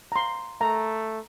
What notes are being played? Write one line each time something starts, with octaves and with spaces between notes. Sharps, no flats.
A#5 C6
A3 A#5